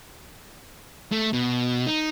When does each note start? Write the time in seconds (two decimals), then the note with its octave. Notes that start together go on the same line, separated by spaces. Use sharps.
1.12 A3
1.33 B2
1.87 D#4